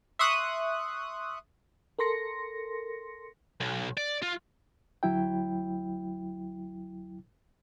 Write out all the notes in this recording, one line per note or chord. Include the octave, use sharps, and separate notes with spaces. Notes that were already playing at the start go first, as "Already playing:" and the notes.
E5 C6 C#6 D#6 F#6
A4 A#4 C6 A#6 C#7
B1
D5
F4
D2 F#3 E4 G5